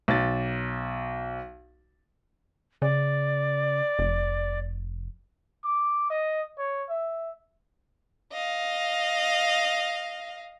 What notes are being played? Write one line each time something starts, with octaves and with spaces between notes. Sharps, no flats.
B1 A6
C#3 D5
F1
D6
D#5
C#5
E5
D#5 F5